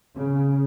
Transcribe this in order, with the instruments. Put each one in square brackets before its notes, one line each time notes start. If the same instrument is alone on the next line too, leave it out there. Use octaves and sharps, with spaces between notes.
[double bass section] C#3